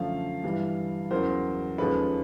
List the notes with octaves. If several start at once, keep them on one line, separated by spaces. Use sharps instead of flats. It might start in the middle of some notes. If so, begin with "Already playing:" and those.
Already playing: F#2 D3 F3 A3 F5
G2 E3 G3
E2 C#3 F#3 A#4 C5
D#2 C#3 F3 G#3 A4 B4